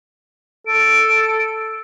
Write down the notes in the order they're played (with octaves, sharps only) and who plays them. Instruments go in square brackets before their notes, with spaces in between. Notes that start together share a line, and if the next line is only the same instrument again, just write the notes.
[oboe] A4 [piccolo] D7